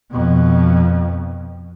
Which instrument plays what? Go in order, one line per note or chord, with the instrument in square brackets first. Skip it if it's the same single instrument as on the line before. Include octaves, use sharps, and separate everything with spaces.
[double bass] F2 B2